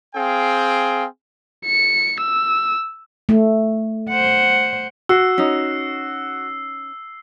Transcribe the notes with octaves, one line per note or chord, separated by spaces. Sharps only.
C4 G#4 F5 G5
C#7
E6
A3
C5 F#5
F#4 E6 C7
C#4 D#4